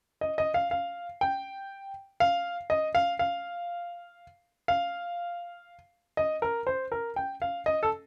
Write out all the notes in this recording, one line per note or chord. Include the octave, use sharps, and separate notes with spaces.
D#5
D#5
F5
F5
G5
F5
D#5
F5
F5
F5
D#5
A#4
C5
A#4
G5
F5
D#5
A4